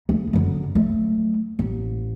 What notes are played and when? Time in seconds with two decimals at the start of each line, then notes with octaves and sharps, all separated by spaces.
0.09 D2
0.33 F#2 D3
0.75 F#3 A3
1.59 A1